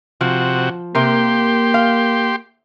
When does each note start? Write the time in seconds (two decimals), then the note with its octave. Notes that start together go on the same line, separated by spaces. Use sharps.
0.21 C3 F3 F#4
0.95 C3 A#3 G4 A#4 C6
1.74 F5